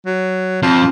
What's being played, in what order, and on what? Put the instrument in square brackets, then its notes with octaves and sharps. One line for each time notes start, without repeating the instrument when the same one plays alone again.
[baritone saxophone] F#3
[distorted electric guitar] F2 [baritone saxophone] F3